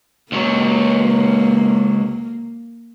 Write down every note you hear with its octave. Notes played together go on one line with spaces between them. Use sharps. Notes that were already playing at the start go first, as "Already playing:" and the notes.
C#2 F#3 A#3